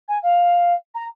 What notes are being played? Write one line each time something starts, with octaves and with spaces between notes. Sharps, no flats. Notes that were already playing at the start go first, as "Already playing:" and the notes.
G#5
F5
A#5